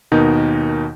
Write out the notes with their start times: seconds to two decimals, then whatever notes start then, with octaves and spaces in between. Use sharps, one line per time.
0.12 D#2 B2 D#4 F#4 A#4 G6